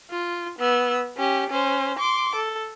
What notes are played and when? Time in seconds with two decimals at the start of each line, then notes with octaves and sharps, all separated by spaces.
0.10 F4
0.59 B3 E6
1.17 C#4 G4
1.50 C#4 C5
1.99 C6 D6
2.35 A4